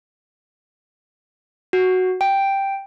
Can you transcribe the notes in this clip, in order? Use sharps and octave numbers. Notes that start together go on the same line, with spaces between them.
F#4
G5